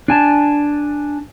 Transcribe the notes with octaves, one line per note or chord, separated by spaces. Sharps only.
D4 G#5 A5